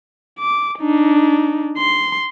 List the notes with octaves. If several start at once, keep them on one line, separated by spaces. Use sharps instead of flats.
D6
D4 D#4
C6